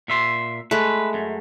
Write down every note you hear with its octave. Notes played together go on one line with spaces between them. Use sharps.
A#2 E5 C6
G#3 A3 B4
F#2